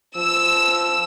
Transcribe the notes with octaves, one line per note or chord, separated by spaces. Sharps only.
F3 E6